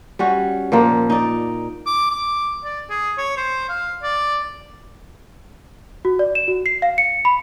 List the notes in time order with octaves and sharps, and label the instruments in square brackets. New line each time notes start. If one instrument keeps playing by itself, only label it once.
[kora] G3 C#4 F#4
A#2 F3 A#3
D#4 D5
[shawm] D6
D6
D5
G#4
C#5
C5
F5
D5
[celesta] F#4
D5
E7
F#4
C7
F5
C#7
B5